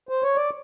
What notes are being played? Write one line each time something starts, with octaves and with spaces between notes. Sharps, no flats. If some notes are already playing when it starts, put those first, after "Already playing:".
C5
C#5
D5